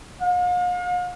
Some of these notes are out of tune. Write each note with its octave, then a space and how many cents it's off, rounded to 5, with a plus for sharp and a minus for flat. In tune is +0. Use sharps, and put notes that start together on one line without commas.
F5 +45